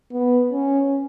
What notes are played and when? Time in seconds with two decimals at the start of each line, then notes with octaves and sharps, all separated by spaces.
0.13 B3
0.52 C#4